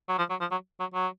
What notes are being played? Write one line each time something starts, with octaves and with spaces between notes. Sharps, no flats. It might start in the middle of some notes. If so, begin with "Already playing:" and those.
F#3
F3
F#3
F3
F#3
F#3
F#3